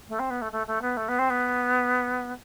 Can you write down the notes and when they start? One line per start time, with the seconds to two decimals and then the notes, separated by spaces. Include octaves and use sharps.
0.08 A3
0.19 C4
0.30 B3
0.41 A3
0.52 A3
0.67 A3
0.81 B3
0.97 A3
1.08 B3
1.19 C4
1.30 B3